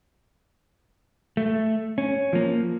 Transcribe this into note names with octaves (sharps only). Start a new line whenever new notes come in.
A3
C#4
F3 A#3